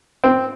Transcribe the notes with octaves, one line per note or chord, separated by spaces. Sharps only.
C4